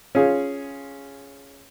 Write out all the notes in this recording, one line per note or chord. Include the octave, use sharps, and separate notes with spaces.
C#4 F4 G#4